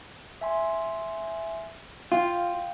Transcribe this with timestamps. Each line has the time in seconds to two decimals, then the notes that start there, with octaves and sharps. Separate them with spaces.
0.41 E5 G#5 C6
2.12 F4 F5 G5